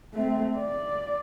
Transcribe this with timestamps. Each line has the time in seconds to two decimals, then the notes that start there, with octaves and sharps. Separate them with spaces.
0.14 A3 C4
0.57 D5